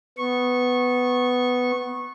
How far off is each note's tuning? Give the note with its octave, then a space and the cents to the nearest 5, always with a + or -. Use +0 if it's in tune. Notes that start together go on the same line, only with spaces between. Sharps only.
B3 +10 C#6 -20